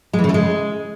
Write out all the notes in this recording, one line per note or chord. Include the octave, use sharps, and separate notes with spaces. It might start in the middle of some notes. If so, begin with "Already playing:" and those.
G#3
E3
C#3
A3
G#3